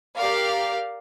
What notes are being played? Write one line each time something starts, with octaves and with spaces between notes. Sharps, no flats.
G4 A#4 D5 F5